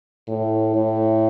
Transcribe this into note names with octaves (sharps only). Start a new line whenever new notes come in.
A2
A2